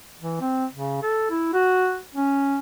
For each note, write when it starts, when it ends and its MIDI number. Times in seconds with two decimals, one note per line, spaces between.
0.21 0.39 52
0.41 0.66 60
0.74 1.02 49
1.03 1.27 69
1.30 1.53 64
1.54 1.97 66
2.15 2.59 61